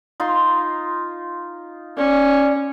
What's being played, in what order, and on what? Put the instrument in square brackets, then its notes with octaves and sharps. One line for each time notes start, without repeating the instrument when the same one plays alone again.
[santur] D#4 F4 C6
[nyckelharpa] C#4 [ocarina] D5